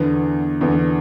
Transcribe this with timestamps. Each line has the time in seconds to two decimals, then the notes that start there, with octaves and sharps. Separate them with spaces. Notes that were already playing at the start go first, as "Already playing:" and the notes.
Already playing: E2 D3 B3
0.61 E2 D3 B3